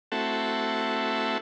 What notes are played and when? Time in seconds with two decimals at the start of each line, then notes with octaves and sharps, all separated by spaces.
0.12 A3 C4 E4 F#4 A4